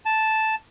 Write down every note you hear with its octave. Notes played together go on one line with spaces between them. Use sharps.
A5